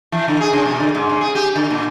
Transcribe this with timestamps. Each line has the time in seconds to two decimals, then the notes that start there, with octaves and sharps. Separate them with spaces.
0.12 E3
0.28 D3
0.41 G#4
0.53 C#3
0.65 B2
0.80 D3
0.95 G#2
1.09 C#3
1.21 G#4
1.35 G4
1.55 D3
1.70 A#2